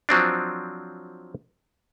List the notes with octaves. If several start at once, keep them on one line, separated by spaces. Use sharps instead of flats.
F3 F#3 C4 D4